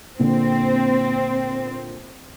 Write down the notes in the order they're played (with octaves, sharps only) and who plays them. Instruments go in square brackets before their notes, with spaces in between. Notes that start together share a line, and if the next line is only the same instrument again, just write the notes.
[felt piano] A#2 D3 F4 [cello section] C4